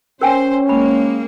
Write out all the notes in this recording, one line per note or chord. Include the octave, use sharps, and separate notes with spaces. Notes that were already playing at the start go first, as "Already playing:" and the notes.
C#4 A#4 C5 G5 G#5
G#3 A#3 B5